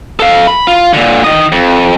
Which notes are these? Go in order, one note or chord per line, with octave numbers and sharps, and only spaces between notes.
A4 F5
B5
F4
A#2 D3
D#3 D#5
F2